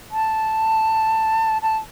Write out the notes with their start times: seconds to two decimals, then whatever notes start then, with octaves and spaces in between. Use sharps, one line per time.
0.11 A5
1.62 A5